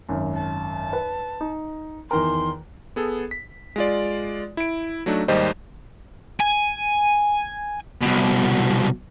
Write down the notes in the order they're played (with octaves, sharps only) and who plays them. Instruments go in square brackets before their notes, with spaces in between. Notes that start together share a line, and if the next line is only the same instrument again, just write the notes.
[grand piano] G#1 F#2
[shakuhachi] A5
[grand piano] B4
D#4
[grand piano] E2 D#3 A#4 [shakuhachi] C6
[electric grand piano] B3 G#4 A4
B6
G#3 F4 D5
E4 D7
F#3 A3 D4 D#4
D#2 G#2 G3 D#4 C5 D#5
[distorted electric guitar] G#5
C2 B2